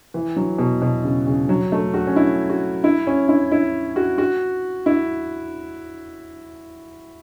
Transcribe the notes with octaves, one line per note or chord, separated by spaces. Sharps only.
E3
F#3
B2
B2
C#3
C#3
F#3
A3
F#4
C#4
E4
F#4
E4
C#4
E4
E4
F#4
F#4
E4